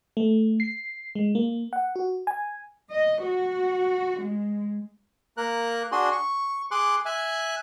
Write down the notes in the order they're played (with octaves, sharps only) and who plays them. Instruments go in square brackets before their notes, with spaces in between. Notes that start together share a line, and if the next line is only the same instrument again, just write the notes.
[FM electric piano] A3
C7
G#3
A#3
F#5
F#4
G#5
[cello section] D#5
F#4
G#3
[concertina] A#3 A#4 F#6
D4 F#4 G#4 C6
C#6
G#4 C6 D6 F#6
E5 G#5 F#6